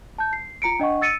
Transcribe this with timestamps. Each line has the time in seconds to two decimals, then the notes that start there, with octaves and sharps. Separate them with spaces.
0.18 A5 G6
0.33 C7
0.62 F4 A#5 C#7 D7
0.80 D4 D#5 F#5 C#6
1.02 E6 A6 C#7 D#7